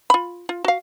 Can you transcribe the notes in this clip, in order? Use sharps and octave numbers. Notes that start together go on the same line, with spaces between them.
F4 B5
F4
F#4 F5